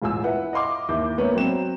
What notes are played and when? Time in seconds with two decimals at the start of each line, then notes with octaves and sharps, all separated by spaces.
0.02 E1 A1 F4 G#5 E6
0.23 E4 B4 F#5
0.53 D#5 F5 C6 D6
0.89 D#2 E4 D6 G6
1.18 A#3 B3 D4 A#4 C#5
1.35 F#3 C4 E7